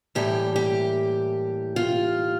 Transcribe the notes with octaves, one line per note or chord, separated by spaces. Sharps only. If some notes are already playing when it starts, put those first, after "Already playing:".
A2 E3 G3 A#3 G4
G4
F4